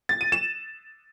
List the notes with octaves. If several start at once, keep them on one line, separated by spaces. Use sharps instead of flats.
A6
D#7
E7